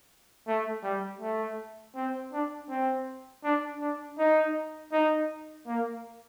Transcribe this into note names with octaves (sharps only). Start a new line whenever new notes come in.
A3
G3
A3
C4
D4
C4
D4
D4
D#4
D#4
A#3